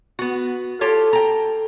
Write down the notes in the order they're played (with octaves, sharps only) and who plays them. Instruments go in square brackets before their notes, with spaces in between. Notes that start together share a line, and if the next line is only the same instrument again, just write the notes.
[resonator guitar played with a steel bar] B3 F#4
[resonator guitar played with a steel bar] F4 G4 C#5 [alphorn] A4
[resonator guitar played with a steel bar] G5 A#5